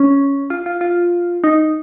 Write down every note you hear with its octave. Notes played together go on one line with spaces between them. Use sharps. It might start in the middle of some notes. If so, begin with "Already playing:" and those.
Already playing: C#4
F4
F4
F4
D#4